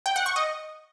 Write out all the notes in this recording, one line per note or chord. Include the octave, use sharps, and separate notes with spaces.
G5
F#5
C#6
D#5